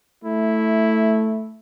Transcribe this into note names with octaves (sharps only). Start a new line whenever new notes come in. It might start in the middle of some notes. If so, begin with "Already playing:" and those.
A3 E4